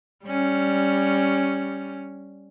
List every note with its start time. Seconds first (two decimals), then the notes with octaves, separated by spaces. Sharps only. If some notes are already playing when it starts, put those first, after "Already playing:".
0.25 G3 C#4